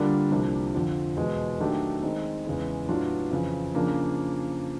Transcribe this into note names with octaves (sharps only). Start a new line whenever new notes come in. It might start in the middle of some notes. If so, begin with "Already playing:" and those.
Already playing: D3 G3 A#3 D4 F4
C2 C3 F3 A#3 D4
F2 D3 F3
E2 B2 G#3
D#3 F#3 A3 D4 G4
D#3 G#3 C4 D#4
E2 C#3 E3 G#3
A2 F#3 B3 D4 F4
F2 C#3 E3
C#3 F3 A#3 D4